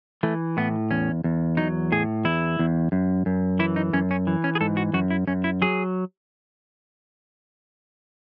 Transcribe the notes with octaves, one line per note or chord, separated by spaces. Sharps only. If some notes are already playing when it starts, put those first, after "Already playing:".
E3 A3
A2 B3
E2 C#4
E2
F#3 D#4
A2 G#4
E2 E4
E2
F#2
F#2
E3 E4
D#4
F#2 C#4
C#4
E3
C#4
G#4
G#2 A4
F#4
F#2 F#4
E4
F#2 C#4
E4
F#3 G#4